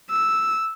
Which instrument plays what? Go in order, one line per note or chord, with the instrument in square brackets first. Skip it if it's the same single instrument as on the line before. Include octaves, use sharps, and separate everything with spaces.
[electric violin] E6